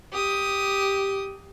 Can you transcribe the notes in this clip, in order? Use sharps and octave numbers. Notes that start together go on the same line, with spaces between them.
G4 D#6